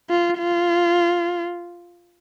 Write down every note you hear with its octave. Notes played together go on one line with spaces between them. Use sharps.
F4
F4